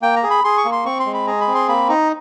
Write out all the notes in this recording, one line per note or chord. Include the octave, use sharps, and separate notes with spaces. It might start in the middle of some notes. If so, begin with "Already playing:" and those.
A#3 G5
A#5
G#4
B5
G#4 C6
C#6
A#3
C6
C4 C#6
C6
G#3
B5
G#4 A#5
B5
C4
C6
A#3 B5
D#4 A#5